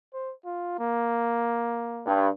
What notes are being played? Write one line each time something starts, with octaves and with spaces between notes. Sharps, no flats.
C5
F4
A#3
G2